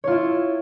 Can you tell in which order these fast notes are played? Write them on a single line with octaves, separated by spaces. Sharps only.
C#5 F4 E4